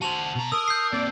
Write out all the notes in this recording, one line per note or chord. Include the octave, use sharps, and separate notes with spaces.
F#4 C5 A5 F7 F#7
B2 A#5
A#4 D#6 E6
G6 C7
A#2 C4 D5